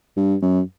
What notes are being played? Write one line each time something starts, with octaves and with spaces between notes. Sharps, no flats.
G2
F#2